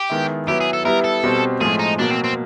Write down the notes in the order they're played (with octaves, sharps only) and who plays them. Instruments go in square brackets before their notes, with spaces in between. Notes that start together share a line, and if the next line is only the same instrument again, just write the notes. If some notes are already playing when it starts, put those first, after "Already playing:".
Already playing: [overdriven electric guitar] G4
[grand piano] D#3 G#3 B3 E4
[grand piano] F#3 B3 E4 [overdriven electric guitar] G4
[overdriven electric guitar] G#4
A4
[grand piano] G3 B3 E4 [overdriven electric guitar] A#4
[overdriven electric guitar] A4
[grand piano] B2 G3 C4
[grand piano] A2 F3 G#3 [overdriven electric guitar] G#4
[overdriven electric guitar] D#4
[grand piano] B2 F#3 A#3 [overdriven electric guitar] D4
[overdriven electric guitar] C4
C4